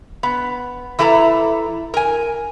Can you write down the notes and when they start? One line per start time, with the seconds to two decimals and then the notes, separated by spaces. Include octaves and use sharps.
0.23 B3
0.99 E3 E4 A4 A5 A#5
1.94 A#4 G#5